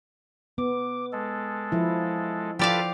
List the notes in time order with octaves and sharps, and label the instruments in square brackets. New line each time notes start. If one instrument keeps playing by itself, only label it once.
[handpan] B3 [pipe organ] D6
[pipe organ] G#3 A4
[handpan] F3 E4
[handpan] F3 [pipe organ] F4 A4 B4 [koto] G4 D5 F5